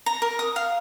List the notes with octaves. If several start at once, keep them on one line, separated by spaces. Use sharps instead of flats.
A#5
A#4
D#6
F5